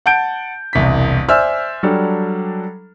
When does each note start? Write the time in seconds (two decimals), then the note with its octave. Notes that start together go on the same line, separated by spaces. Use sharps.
0.06 F#5 A5 G6 D7
0.73 E1 C2 B6
1.29 C5 D5 E5 G#5 E6 F6
1.83 F#3 G3 D4 A4